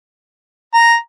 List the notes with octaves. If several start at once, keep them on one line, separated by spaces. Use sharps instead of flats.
A#5